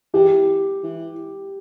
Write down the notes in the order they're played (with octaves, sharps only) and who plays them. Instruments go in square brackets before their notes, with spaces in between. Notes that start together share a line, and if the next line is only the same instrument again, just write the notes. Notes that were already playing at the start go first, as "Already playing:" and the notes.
[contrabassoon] E3 [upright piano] G4
[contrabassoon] E3